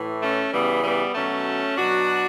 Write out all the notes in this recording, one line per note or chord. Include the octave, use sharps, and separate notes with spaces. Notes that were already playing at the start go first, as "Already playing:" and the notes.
Already playing: A2 E3
A3 C#4
C#3 E3 G3 B3
G3 B3
B2 F#3 A3 C#4
B2 F#3 D4 F#4